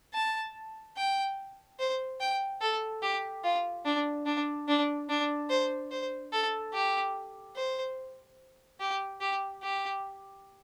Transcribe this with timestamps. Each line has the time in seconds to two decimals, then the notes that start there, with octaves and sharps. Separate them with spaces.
0.14 A5
0.97 G5
1.79 C5
2.20 G5
2.61 A4
3.03 G4
3.44 F4
3.85 D4
4.26 D4
4.68 D4
5.09 D4
5.50 C5
5.91 C5
6.32 A4
6.74 G4
7.56 C5
8.80 G4
9.21 G4
9.62 G4